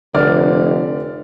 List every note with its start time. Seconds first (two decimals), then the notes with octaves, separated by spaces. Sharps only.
0.14 F1 D3 D5 F6